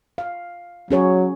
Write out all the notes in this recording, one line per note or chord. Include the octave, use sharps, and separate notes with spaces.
F5
F#3 C#4 G#4 C#5